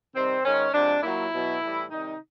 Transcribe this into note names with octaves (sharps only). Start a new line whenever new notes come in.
C3 D#3 G3 C4
G#2 D#3 G#3 C#4
C3 F3 G#3 D4
A#2 F#3 E4
B2 F#3
A2 E3 G3
C3 D#3 G3 D#4